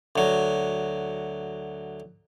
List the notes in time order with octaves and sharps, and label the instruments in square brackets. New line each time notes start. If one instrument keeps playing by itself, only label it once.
[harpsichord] D2 F#3